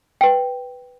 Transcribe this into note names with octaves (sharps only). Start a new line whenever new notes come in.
B4 G5